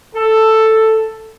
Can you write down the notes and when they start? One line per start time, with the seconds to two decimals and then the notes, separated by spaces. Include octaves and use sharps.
0.15 A4